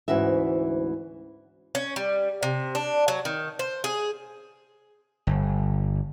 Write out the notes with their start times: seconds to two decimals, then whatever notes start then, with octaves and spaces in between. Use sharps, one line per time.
0.08 D2 G#2 E3 C#4 F#4 E5
1.75 C#4
1.96 G3
2.43 C3
2.75 D4
3.08 F#3
3.25 D#3
3.59 C5
3.84 G#4
5.27 G1